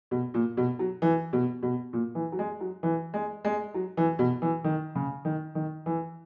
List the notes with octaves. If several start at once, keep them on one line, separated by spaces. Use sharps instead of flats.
B2
A#2
B2
F#3
E3
B2
B2
A#2
E3
F#3
G#3
F#3
E3
G#3
G#3
F#3
E3
B2
E3
D#3
C#3
D#3
D#3
E3